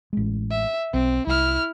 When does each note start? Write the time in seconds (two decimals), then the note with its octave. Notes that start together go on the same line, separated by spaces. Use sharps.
0.13 A1 G#3
0.51 E5
0.93 B1 C4
1.27 C2 E4 F6